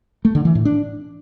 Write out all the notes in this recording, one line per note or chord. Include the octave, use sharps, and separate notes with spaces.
A3
D3
E3
A2
D4